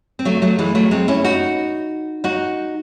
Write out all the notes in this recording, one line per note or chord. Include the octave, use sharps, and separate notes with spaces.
C4
F#3 A3
F#3 A3
E3 G#3
F#3 A3
G#3 C4
C#4 E4
D#4 F#4
D#4 F#4